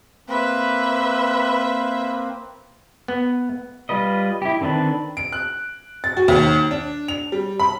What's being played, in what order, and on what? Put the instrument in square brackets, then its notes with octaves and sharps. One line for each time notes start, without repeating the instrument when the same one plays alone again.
[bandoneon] A#3 C4 [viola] B4 E5
[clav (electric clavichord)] B3
[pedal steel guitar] G3 F4 B4 D#5
E4 G4
D3 D#3 C4 D4 B4
[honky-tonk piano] D7
F#6
A6
F#4
D#2
D4
F7
G3
B5